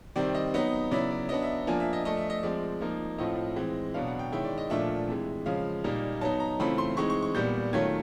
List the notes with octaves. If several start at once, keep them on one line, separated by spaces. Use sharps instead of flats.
C3 D#3 G3 C4 D5
D#5
F#3 B3 D#4
C#3 F#3 B3 E4 D5
D5
F#3 B3 D4 D#5
E5
F3 A#3 D4 F4 G#5
E5
D#5
F3 A3 D4 D#5
E5
D#5
F3 G#3 C4 D5
F3 A#3 D#4
A2 F3 A3 C4 F4 D#5
E3 G#3 C4
B2 F#3 B3 D4 F5
F#5
G5
D#3 G#3 C#4 E4 G5
D5
D#5
A#2 F3 A3 D4 F4 E5
C3 E3 G#3
C#3 F3 G#3 F5
A#2 G3 A#3 D#4
F#3 B3 D#4 A5
A#5
C#3 E3 A3 C4 F4 B5
C6
E3 G#3 C4 D#4 C#6
C#6
C#6
A#2 G3 B3 G6
D#3 F#3 A3 C#4 F4 G#6